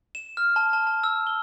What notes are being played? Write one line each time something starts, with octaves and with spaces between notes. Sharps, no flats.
E7
F6
A5
A5
A5
E6
G7